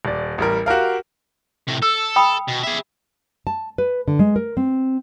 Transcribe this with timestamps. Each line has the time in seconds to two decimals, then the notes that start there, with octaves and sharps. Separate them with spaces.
0.05 D#1 D5
0.38 A1 G3 A#4
0.66 F#4 G4 A#4 F5
1.68 A2 C3
1.82 A4 E6
2.16 G5 B5 D#6
2.48 B2
2.63 G#4 E5
3.47 A5
3.78 B4
4.08 D3
4.19 G#3
4.36 A#4
4.57 C4